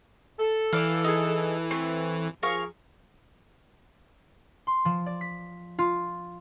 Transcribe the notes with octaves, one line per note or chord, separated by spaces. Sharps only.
A4
E3 D5 F5
D#4 G4 G#4
A3 C4
F3 G#4 A#4 F5 C#6
C6
F3
D5
B6
F4